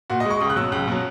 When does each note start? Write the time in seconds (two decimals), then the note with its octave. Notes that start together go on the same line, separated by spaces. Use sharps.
0.10 A#2 F#4
0.20 D#5
0.25 G#3
0.30 C#6
0.41 C#2 D#6
0.50 F#6
0.56 B2 F#3 E6
0.72 C#2 F#6
0.88 B2 F#3